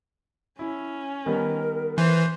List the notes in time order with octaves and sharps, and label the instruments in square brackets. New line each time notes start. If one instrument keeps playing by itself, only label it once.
[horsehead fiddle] C#4 [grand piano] E4
[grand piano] D#3 G3 B3 [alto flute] A#4
[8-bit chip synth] E3 [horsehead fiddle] C5